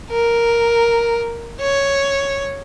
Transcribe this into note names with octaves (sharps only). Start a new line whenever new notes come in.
A#4
C#5